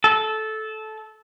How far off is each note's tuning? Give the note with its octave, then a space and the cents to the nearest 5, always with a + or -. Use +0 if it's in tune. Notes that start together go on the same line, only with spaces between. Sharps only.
A4 -15